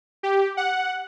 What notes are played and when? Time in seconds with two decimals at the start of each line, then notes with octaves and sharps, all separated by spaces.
0.23 G4
0.57 F#5